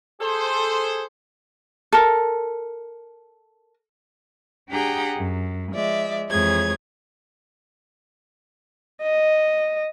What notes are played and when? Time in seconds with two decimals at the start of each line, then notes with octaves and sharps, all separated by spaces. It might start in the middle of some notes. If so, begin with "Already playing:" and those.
0.21 G#4 A4 C5
1.92 A4 A#4
4.69 D4 G4 G#4 F#5 G5 A#5
5.17 F#2
5.73 F3 G#3 D5 E5
6.30 F2 E3 G#3 G#4 C#5 G#6
9.02 D#5